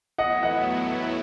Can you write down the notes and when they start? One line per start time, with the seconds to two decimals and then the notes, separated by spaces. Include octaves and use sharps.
0.18 A2 F#3 B3 E4 D#5 F#5
0.43 D#5 F#5